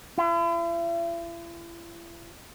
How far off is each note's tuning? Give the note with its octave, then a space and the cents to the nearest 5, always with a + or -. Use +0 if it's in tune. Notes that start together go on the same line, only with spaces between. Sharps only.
E4 +45